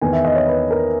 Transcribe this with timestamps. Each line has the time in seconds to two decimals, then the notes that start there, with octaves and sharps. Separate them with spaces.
0.01 E2 D#3 G#5
0.13 E5
0.25 D#5
0.36 C#5
0.48 B4
0.71 A#4